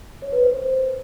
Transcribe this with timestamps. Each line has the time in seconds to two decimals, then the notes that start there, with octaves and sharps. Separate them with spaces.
0.22 C#5
0.32 B4
0.43 C5
0.53 C5